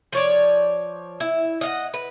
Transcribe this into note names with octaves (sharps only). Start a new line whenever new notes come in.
F3 C#5 D5
E4
D#5 F5 F#5
B4